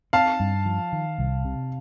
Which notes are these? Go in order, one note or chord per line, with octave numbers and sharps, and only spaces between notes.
C4 F5 A5
G2
F3
D#3
C2
C3